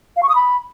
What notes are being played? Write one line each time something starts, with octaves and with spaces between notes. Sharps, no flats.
F5
C#6
D#6
B5